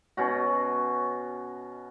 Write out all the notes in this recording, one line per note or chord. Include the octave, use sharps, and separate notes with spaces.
B2 C#4 F#4